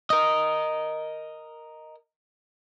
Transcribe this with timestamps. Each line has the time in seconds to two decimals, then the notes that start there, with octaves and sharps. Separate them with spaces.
0.10 A#4 D#5